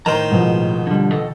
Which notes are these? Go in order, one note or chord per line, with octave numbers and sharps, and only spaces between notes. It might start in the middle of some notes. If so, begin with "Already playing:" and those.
A2 D#3 A#4 C5 A#5
G#2 B2 F3
D3 G3
D#3 A4 D#5